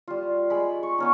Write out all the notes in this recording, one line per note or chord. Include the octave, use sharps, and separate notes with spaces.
G3 F4
G#3 B5
C#6
B3 C#4 D#4